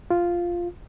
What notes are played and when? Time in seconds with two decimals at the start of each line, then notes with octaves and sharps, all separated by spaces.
0.11 F4